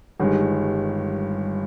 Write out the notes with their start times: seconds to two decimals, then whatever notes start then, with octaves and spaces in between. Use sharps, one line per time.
0.20 G1 G2 D#3 G#3